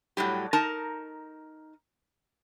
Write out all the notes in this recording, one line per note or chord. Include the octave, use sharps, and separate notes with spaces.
A2 F#3 G3 G4
D#4 A#4 A5 A#5